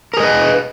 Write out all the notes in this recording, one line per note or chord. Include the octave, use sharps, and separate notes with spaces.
G#4 A#4 B4 D#5